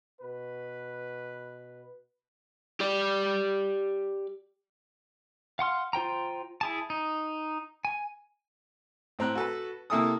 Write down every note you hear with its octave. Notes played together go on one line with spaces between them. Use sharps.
B2 B4
G4 D5
F5 F#5 C6 F6
F4 C5 G5 A#5
E4 G#4 A5
D#4
G#5
A2 C4 A#5 F#6
F#4 A4 B4
C3 A#3 E4 A4 A5 D#6